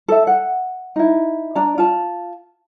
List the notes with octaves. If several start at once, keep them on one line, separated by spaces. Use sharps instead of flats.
A4 E5
F#5
D#4 E4
D4 D5 A#5
F4 A5